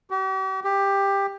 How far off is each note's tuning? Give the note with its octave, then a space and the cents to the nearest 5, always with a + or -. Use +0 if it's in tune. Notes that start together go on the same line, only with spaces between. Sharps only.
G4 -45
G4 +15